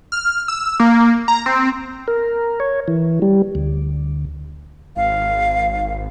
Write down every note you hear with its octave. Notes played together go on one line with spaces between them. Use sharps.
F6
E6
A#3
A#5
C4
A#4
C#5
E3
G3
D2
G#1 F5